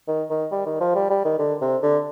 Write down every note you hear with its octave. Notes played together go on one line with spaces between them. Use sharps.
D#3
D#3
G3
D#3
F3
G3
G3
D#3
D3
C3
D3